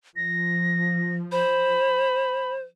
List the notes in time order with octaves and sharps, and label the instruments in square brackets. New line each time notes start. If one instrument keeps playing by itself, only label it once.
[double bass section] F3 [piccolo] A#6
[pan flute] C5 [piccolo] B5